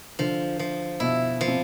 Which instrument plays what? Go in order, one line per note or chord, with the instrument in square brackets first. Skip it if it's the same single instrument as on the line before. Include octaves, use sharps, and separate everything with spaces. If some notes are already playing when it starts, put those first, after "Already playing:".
[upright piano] D3 [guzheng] F3
[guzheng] F3
[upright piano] B2 [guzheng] E4
[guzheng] F3
[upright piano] C3